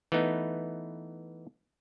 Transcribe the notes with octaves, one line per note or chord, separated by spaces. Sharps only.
E3 A3 B3 D#4